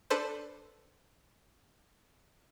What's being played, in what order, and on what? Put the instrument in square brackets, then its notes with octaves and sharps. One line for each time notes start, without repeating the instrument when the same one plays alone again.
[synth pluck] D4 A4 B4 C5